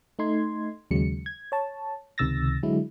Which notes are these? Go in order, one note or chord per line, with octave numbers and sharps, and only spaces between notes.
A3 D#4 C6 G#6
D#2 C#3 F#3 G#3 C#7
G#6
C#5 A5
C#2 C3 D#3 E6 A6 A#6
D3 F#3 G#3 E4